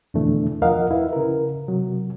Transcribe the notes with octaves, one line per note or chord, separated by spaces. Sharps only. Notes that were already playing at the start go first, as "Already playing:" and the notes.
F2 B2 D3 E3 A3 D4
E2 F3 A#4 D#5 F5 F#5
E4 B4
C#3 A#4
C3 F#3